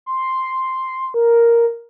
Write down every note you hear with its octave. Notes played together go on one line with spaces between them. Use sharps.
C6
A#4